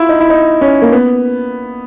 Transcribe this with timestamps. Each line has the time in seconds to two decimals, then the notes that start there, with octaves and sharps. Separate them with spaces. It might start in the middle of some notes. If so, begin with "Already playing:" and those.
Already playing: E4 F4
0.09 D#4
0.20 E4
0.30 D#4
0.61 C#4
0.82 A#3
0.93 B3